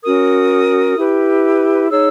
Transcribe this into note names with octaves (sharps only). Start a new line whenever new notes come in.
C#4 F#4 A#4 D#6
E4 G4 B4
D#4 G#4 C#5 E6